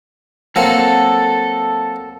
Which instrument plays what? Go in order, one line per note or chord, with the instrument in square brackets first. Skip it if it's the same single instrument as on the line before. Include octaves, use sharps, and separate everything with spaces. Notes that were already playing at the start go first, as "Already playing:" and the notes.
[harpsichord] F#3 A#3 C4 [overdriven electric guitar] A4